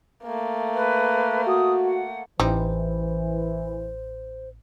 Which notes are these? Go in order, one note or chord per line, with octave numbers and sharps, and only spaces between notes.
A3 A#3
B4
F#4 D#6
F#5
A1 E3 G3 C4 D#4 C5